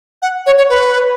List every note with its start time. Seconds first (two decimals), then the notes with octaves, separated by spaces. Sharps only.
0.22 F#5
0.46 C#5
0.58 C#5
0.70 B4